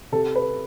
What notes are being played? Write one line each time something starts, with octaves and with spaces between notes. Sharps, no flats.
C3 A4
B4